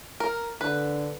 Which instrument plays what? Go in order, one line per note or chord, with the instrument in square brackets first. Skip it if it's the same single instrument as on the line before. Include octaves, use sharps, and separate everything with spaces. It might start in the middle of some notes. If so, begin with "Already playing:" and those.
[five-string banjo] A#4
[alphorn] D3 [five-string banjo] B4